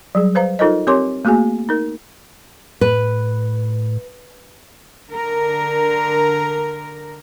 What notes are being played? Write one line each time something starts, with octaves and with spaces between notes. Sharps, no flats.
F#3 G3 G#4
B4 C5 F5 A#5
D#4 F4 A4 A#4 C5 D#5
C4 G4 A#4 C#5 C6 D6
A3 A#3 F#4 G#4 G#5
D#4 A#4
A2 B4
D3 A#4